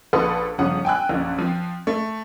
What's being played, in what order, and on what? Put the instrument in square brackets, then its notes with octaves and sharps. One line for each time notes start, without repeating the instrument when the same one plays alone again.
[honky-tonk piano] A#1 A4 B4 F#5 C6 D#6
G1 C#3 F3 F#5 D#6
G5 G#5 E6 F#6
A#1 F#2
F3 C4
A3